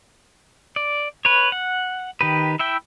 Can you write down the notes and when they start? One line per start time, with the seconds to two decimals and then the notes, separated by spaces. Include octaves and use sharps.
0.76 D5
1.25 B4 C#5
1.52 F#5
2.21 D#3 G4 B4
2.59 E4 E5 G5